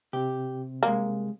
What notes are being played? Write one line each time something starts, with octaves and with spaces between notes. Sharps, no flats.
C3 C4 G4
C2 G#3 A#3